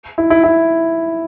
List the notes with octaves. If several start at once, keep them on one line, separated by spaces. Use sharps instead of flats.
E4
E4
E4